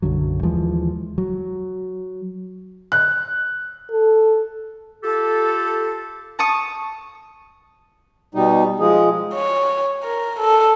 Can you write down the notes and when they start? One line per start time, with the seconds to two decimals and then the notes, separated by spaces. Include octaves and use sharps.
0.02 B1 F#2 D3 F#3
0.43 D#2 E3 F3 G#3
1.18 F#3
2.92 F#6
3.91 A4
5.03 F4 G4 A4
6.39 A5 C#6 D#6
8.35 B2 G3 D#4
8.80 F3 G#3 G#4
9.34 C#5
10.04 A#4
10.39 A4